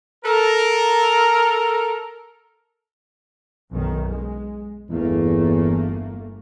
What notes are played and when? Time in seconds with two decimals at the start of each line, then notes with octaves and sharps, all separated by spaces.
0.25 A4 A#4
3.71 B1 F#2 D#3
4.09 G#3
4.90 G1 E2 A3 A#3